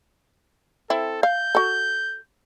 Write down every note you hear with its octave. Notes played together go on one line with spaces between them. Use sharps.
C4 E4 A4
F5 G6
F#4 A4